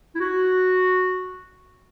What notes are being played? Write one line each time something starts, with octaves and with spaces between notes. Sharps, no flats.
E4
F#4